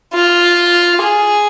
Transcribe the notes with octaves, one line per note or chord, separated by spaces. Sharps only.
F4
G#4